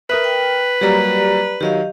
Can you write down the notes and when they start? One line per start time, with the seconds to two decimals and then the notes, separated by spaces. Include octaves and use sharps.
0.10 A#4 B4 E5 D#6 F#6
0.24 G5
0.81 F#3 G3 A#3 G4 D5 A#5
1.61 D#3 F#3 G4 D#5 F5